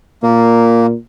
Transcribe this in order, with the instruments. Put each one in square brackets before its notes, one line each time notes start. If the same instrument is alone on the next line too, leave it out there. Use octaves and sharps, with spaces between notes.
[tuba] A#2 [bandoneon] A#3